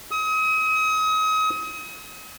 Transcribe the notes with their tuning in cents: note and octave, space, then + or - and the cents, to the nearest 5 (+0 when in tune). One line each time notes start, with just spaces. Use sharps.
D#6 +35